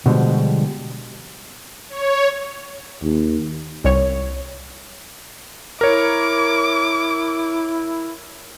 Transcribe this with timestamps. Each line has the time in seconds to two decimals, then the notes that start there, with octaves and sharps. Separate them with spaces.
0.06 B2 D3 F3 G3 G#3
1.89 C#5
3.03 D#2
3.84 C2 C#5
5.81 E4 A#4 C#5 D6